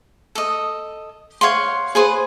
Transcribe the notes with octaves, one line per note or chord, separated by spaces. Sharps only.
A4 D#5
C#5 F5 F#5 C6
G#4 B4 C5